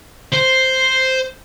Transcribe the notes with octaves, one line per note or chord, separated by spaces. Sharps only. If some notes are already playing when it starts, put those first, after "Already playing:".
C5